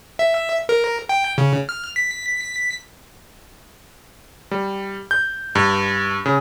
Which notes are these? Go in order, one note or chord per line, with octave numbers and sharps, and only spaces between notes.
E5
A#4
G5
C#3
F6
B6
G3
G6
G2
C#3